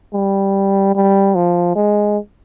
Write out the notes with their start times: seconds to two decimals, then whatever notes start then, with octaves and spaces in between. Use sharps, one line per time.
0.14 G3
0.95 G3
1.35 F3
1.75 G#3